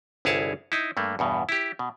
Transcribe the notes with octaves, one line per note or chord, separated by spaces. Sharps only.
G1 C2 E4 G#4 C#5 A5
D#4 E4
G2 A3 A#3
E2 G2 B2
E4 G4
B2